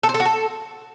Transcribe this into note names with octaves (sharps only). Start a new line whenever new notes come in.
A4
C5
A4
F#4
A4